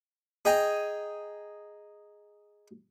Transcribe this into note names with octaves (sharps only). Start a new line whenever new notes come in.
G#4 D#5 G5 G#5 A#5